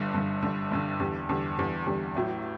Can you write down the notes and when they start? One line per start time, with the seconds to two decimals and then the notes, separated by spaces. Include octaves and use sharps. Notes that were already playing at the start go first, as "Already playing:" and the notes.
Already playing: G1 G2 D3
0.14 G1 G2 D3
0.43 G1 G2 D3
0.71 G1 G2 D3
1.00 E2 D3 G3
1.29 E2 D3 G3
1.58 E2 D3 G3
1.86 E2 D3 G3
2.15 A1 A2 F#3